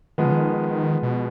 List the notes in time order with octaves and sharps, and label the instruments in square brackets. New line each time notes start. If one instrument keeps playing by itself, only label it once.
[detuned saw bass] D#3 [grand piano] F3 G#3 B3
[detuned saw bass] C#3
D#3
B2